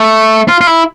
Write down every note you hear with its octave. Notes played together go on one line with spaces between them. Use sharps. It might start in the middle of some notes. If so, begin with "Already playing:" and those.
Already playing: A3
F4
F4
E4